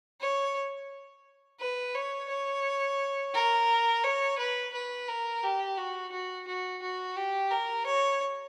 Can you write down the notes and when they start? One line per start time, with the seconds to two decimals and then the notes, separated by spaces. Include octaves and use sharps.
0.21 C#5
1.60 B4
1.94 C#5
2.29 C#5
3.34 A#4
4.03 C#5
4.38 B4
4.73 B4
5.08 A#4
5.43 G4
5.77 F#4
6.12 F#4
6.47 F#4
6.82 F#4
7.16 G4
7.51 A#4
7.86 C#5